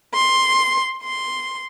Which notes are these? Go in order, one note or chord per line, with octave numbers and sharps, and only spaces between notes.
C6
C6